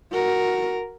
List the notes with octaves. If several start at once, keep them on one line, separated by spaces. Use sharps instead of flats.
F#4 A#4